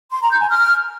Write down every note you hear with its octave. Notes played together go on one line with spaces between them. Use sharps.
C6
A#5
G6
G#5
F6